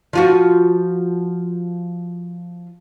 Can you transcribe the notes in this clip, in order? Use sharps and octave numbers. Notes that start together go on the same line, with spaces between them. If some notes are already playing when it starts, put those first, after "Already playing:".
F3 F4 F#4